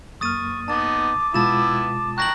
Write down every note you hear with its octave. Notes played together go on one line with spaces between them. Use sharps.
F#2 A#3 C#6 D#6 F6 A6 D#7
B3 D#4 A5 D6 A6
B2 G#3 B3 E4 F4 A5 A6 E7
G5 A#5 C#6 F#6 A#6 F#7